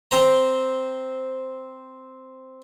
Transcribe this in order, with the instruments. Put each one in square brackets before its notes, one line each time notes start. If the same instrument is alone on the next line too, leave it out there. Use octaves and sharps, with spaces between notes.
[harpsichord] C4 C5 A#5